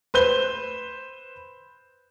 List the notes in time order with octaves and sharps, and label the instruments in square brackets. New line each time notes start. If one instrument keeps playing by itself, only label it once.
[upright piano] B4 C5 G6 G7